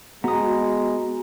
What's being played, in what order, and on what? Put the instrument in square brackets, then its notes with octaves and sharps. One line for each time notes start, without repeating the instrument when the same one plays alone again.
[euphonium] G#3 [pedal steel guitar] B3 D#6 [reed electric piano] F#4 A#5